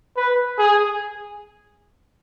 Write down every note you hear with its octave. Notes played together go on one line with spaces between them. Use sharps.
B4
G#4